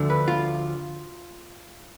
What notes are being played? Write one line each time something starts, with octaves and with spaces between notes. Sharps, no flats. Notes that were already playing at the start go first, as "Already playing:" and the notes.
Already playing: D2 D3 F3 A3
B4
F4